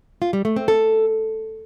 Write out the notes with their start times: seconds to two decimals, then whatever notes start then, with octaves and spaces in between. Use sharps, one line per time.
0.22 F4
0.33 G3
0.45 A3
0.56 C4
0.68 A4